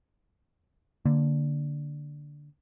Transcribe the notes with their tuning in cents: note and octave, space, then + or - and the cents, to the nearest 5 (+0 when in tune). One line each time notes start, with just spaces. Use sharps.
D3 +0 A#3 -5